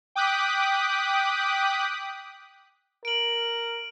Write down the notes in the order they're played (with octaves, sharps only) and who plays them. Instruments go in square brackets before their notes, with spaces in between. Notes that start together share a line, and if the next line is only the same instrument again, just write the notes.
[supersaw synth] G5 D6 D#6 F#6 B6
[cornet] A#4 [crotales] D7 F#7